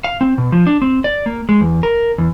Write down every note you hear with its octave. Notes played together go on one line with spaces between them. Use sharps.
F5
C4
B2
F3
D4
C4
D5
A#3
G#3
E2
A#4
E2